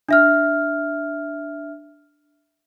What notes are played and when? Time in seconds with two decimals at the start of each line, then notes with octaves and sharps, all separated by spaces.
0.09 D4 E5 F6